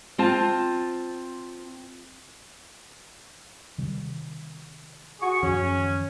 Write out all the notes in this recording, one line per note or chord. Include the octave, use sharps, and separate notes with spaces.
C4 F4 A5
C3 D#3 G3
F#4 G#4 C#6
F#2 D#3 F3 C#4